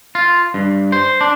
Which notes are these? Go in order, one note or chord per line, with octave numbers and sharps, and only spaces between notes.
F4
G2
C5
D4